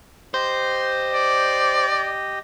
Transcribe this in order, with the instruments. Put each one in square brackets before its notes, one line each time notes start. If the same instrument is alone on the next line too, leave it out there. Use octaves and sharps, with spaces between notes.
[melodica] G4 D#5 [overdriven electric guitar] C5
[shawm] D5